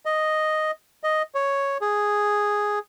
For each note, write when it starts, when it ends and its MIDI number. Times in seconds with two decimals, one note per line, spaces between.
0.06 0.71 75
1.03 1.22 75
1.35 1.78 73
1.81 2.79 68